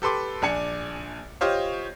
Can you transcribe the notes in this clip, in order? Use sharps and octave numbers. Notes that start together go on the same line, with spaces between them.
G4 A4 B4 C6 D6
A#1 D4 G#5 C#7
F4 G4 C5 C#5 D#5 F5